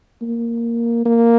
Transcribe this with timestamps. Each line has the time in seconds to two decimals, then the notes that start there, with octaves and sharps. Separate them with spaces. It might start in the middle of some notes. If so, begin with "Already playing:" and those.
0.22 A#3
1.05 A#3